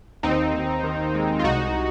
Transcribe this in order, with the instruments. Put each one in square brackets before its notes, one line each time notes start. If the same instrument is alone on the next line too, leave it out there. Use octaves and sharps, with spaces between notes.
[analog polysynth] D#2 C4 D#4
D#2
D#3
G#3
F4
C2 D#4 F#4